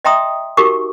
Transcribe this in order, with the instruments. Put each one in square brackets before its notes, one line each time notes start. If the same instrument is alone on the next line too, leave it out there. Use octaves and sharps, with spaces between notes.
[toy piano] D#5 E5 G5 A#5 C6 D#6
D#4 F#4 G4 A#4 C#6 D6